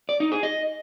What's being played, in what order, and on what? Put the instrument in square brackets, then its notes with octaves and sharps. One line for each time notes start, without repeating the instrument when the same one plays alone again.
[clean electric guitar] D5
D#4
G#4
D#5